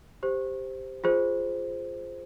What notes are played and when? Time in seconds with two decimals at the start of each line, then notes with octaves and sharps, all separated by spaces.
0.23 G4 C5
1.04 F4 G#4 C5